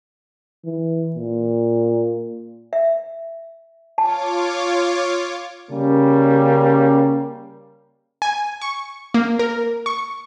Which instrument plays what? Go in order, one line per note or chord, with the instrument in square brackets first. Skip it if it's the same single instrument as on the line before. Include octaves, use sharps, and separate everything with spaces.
[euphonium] E3
A#2
[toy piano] E5
[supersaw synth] F4 C#5 D6 [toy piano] A5
[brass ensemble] C#3 G3 A#3 C#4
[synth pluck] G#5
C#6
A#3
A#4
C#6